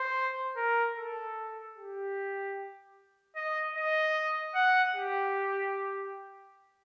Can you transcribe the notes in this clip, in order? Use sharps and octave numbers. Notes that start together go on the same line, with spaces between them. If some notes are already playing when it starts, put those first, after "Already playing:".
Already playing: C5
A#4
A4
G4
D#5
D#5
F#5
G4